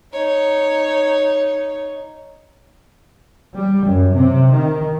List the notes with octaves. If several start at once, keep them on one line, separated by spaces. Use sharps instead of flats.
D#4 C#5
G3
F#2
C3
D#3